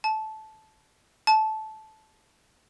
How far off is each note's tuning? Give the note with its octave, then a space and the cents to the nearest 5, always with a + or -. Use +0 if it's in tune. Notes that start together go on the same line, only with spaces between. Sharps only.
A5 -15
A5 -15